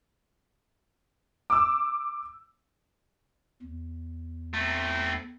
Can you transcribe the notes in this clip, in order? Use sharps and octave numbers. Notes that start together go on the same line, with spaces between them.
D6 E6
E2
A3 C4